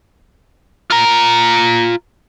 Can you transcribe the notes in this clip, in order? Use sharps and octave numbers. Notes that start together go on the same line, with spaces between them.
F4 A#5